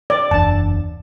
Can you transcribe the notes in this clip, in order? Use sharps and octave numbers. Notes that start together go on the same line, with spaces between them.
D5
F#1 E2 D4 A5